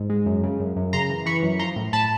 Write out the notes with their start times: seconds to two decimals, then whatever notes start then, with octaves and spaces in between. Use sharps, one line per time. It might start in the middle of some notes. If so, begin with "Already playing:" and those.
Already playing: G#2
0.10 G#3
0.26 F#2
0.43 C#3
0.60 F#2
0.76 F#2
0.93 C#3 A#5 C6
1.10 E3
1.26 E3 B5 C#6
1.43 F#2
1.59 F3 A#5 C6
1.76 A2
1.93 A2 A5 B5